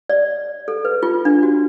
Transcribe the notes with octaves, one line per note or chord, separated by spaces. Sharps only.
D5
A4
B4
F4
D4
F#4